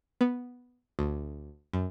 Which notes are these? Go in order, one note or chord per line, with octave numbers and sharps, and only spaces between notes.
B3
D2
F#2